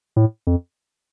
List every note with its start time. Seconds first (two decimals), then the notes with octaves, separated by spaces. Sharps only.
0.16 A2
0.47 F2